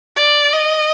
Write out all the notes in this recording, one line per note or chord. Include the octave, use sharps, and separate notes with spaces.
D5
D#5